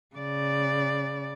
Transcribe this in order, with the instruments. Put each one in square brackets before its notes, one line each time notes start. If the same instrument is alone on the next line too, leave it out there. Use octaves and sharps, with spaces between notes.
[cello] C#3 D5